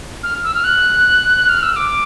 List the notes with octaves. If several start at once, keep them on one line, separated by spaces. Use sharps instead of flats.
F6
E6
F6
F#6
F6
E6
D6